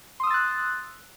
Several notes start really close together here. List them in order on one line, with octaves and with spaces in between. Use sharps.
C6 D#6 E6 A6 F#6